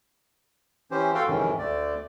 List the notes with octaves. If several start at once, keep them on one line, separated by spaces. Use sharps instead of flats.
E3 C#4 G4 C5
F#4 A4 F5 G5 C6
F2 G#2 C3 D#3 E3 C#4
D2 D3 A3 D5